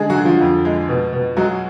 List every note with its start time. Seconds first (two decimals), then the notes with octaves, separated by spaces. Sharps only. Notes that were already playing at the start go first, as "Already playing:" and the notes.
Already playing: D3 G#3 G#4
0.10 F#3 F#4
0.17 D3
0.25 F3 F4
0.41 F2
0.65 G#3
0.89 B2
1.13 B2
1.37 F#3 G#3 F#4